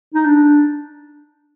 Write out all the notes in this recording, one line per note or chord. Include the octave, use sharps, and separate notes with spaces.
D#4
D4